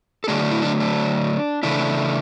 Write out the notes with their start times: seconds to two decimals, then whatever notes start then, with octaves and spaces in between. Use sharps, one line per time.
0.24 A4
0.28 D3 F#3 A3 D4 G#4
0.51 E4
0.62 D4
0.80 D4
1.63 C#3 E3 A3 D4 E4